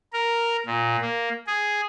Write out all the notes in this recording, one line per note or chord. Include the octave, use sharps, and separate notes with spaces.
A#4
A#2
A#3
G#4